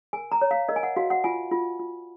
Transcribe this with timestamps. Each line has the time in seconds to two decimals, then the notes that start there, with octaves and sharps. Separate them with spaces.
0.13 A#4 G#5
0.32 A#5
0.41 C#5
0.51 F5
0.69 A#4 D#5
0.76 G#5
0.83 F#5
0.96 F#4 F5
1.10 F#5
1.24 F4 G#5
1.51 F4
1.80 F4